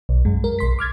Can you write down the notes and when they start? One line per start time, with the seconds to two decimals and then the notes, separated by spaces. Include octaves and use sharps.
0.09 B1
0.25 F#2 G#3
0.44 A#4
0.59 B1 C6 B6
0.79 D6 F6 G#6 A6